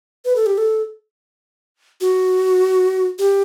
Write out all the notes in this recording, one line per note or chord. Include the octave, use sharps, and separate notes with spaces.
B4
A4
G4
A4
F#4
G4